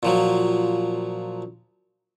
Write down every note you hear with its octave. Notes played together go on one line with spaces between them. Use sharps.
A#2 F3 F#3